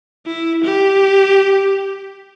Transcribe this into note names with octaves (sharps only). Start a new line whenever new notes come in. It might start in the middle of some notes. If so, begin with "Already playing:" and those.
E4
G4